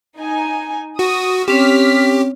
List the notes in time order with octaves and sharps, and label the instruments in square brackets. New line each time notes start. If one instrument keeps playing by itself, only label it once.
[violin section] D#4 G#5
[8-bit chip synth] F#4 [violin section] D#6
[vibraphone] C4 C#4 C#5 [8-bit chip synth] G4 [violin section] F6 B6